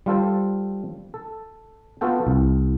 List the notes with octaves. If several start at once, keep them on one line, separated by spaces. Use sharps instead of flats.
G3 F4 A4 C5
A4
B3 F4 F#4 A4 G5
C2